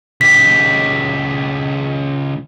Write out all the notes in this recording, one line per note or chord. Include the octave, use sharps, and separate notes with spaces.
C#2 G4 B6